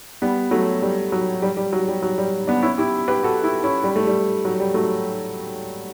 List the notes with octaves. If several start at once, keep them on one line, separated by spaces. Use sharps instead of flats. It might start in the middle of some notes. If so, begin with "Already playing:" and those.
G3 B3
F#3 A3
G3
F#3
G3
G3
F#3
G3
F#3
G3
B3 D4
C#4 E4
E4 G4
G4 B4
F#4 A4
E4 G4
C#4 E4
G3
A3
G3
F#3
G3
F#3 A3